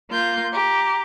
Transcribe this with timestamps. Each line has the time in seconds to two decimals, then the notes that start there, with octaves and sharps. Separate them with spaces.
0.11 A#3 F4 G6
0.53 G4 A#5